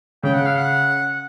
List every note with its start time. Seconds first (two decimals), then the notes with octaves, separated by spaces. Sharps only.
0.23 C#3 G5
0.34 F#5
0.46 F5
0.56 F#5